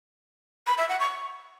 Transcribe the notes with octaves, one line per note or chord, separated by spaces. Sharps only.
B5
E5
F#5
C#6